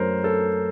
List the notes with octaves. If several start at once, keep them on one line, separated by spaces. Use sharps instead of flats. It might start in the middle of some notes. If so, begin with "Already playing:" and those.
Already playing: F#2 F#3 A3 A#4 C5
A4